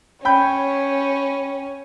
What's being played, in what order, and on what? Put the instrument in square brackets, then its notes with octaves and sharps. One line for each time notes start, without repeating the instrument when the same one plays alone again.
[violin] C#4 [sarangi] C#5 [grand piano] G5 B5 G6